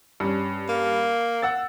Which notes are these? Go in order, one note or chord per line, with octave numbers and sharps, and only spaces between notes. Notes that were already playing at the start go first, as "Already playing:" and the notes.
G2 C#4
A#3
F#5 E6 A6